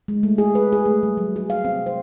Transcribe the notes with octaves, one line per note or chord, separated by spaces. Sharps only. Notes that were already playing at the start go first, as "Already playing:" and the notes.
G#3
A3
G#4
B4
G#4
A3
G3
F#3
G#4
F5
C4
C5